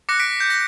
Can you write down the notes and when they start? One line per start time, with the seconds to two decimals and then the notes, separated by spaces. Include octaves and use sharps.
0.09 D6 F#6 A#6 C#7
0.20 B6 D7
0.40 G6
0.50 A#6